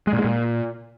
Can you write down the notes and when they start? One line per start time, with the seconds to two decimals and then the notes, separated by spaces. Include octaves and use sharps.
0.07 G#3
0.13 A#2
0.19 G#3
0.24 A#2